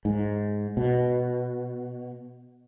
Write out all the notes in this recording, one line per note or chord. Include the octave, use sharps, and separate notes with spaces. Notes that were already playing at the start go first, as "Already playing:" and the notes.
G#2
B2